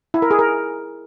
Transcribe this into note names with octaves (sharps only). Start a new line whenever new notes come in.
E4
A#4
G#4
A#4